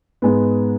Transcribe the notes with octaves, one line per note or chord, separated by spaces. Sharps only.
G#2 G#3 B3